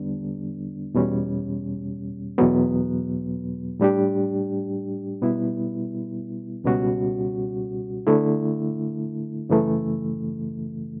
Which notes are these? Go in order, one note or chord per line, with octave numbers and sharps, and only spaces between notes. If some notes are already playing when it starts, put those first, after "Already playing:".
Already playing: E2 D3 G3 B3 D4
E2 B2 G3 C#4
E2 B2 F#3 B3
A2 G3 D4 G4
B2 G3 B3 E4
C#2 B2 G3 C#4 F#4
D3 A3 E4
F#2 C#3 E3 A3